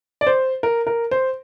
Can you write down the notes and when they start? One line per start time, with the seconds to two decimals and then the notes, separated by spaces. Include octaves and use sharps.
0.21 D5
0.27 C5
0.63 A#4
0.87 A#4
1.11 C5